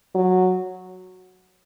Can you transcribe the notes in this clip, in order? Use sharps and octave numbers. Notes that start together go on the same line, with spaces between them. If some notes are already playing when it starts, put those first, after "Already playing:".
F#3